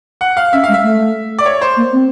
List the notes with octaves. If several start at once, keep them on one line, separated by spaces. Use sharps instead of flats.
F#5
F5
C#4 E5
G#3 F5
E5
A3
D5
C#5
C5
A#3
C4